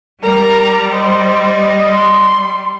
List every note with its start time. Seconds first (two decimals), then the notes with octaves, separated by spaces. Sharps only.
0.24 G3 A#4 A#5
0.93 C5 D#5
1.91 C6